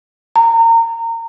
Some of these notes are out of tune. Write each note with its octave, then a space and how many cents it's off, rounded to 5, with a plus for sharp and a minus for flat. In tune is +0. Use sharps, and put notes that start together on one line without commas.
A#5 -30